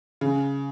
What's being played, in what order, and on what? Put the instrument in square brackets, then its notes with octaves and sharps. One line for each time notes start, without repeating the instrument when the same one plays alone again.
[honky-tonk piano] C#3